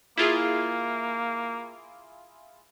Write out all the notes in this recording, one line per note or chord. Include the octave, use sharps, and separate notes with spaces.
A#3 E4 F4 G#4